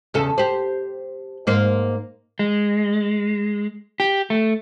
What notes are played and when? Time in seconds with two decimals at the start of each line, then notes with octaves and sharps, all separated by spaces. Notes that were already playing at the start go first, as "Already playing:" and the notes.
0.14 E2 C#3 A4
0.38 G4 C5
1.47 G#2 A#3 C5
2.39 G#3
4.00 G4
4.30 A3